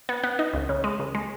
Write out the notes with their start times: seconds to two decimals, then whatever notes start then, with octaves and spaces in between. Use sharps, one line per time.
0.09 B3
0.23 B3
0.39 D#4
0.53 C#2
0.69 C#3
0.84 G#3
0.99 C#2
1.15 G#3